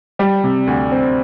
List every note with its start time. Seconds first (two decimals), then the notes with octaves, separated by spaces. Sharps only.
0.19 G3
0.44 C3
0.67 D2
0.92 C4